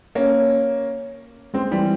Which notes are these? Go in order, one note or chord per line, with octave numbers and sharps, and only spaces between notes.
A#3 C#4
G#3 C4
E3 G3